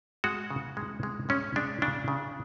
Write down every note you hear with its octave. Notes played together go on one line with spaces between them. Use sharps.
G#3 F#4
C#3
G#3
G#3
G#3 C#4
G#3 D4
C#3 D4
C#3